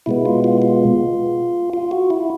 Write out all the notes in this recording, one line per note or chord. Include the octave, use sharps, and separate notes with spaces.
B2 G#3 B3 E4
F4
F4
F4
F4
F#4
E4